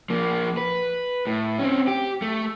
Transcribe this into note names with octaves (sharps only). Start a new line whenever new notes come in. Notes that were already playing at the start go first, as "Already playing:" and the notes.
F3 A#3
B4
A2
C4 C#4
G4
A3